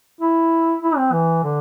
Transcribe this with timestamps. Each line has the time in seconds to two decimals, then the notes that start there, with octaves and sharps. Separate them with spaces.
0.21 E4
0.83 E4
0.97 C4
1.12 E3
1.44 D3